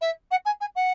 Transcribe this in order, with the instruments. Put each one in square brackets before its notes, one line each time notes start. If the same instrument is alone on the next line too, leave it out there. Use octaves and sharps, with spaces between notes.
[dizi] E5
F#5
G#5
G#5
F#5